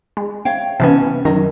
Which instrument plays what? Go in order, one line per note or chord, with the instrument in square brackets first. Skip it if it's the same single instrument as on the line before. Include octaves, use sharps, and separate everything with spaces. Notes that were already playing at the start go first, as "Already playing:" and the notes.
[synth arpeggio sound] G#3
[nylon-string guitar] C#5 F5 G5
[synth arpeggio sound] C3 E3 B3 [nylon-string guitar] C#4 A5
[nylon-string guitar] F#2 A#4 [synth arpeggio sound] D#3